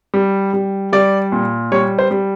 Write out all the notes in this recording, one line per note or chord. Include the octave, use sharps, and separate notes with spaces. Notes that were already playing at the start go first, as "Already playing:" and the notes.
G3
G3
G3 D5
A#2
G3 C#5
C5
G3